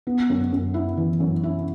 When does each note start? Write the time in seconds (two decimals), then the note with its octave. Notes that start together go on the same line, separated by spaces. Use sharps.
0.07 B3
0.30 F#2
0.52 F#2
0.74 E4
0.97 E3
1.20 F#2
1.43 E4